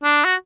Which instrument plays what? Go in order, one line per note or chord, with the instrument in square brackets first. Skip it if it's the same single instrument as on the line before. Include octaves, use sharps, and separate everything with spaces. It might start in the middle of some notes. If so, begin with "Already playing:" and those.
[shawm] D4
F#4